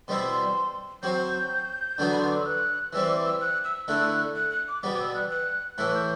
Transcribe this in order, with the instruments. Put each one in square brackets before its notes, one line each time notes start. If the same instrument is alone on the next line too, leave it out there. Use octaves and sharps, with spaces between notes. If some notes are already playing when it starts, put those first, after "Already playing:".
[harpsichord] B2 G3 C4 E4 [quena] C6
[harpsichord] F#3 C4 F#4 [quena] G6
[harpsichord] D3 F#3 B3 D4 F#4
[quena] B5
C6
D6
E6
F#6
[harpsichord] E3 G3 C4 [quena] E6
[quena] D6
E6
F#6
E6
[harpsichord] D3 A3 E4 [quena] F#6
[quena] F#6
F#6
D6
[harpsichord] B2 G3 B3 [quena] D6
[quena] D6
E6
F#6
F#6
[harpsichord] A2 E3 A3 E4 [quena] F#6
[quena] G6